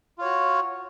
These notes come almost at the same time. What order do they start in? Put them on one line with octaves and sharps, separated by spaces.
F4 C#5 F#4